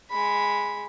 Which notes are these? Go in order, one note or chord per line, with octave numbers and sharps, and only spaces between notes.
G#3 B5